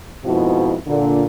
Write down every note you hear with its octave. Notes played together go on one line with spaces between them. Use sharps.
F2 G#2 B2 F3 E4
A#2 D3